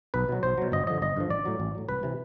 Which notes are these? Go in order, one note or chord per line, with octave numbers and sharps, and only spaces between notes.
B1 B4
B2 F#3
B1 C5
B2 F#3
G1 D#5
G2 D3 F3 D#5
G1 D#5
G2 D3 F3
A1 D5
A2 F#3
A1
A2 F#3
C2 B4
C3 E3